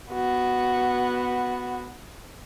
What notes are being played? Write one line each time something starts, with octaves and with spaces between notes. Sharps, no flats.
B3 F#4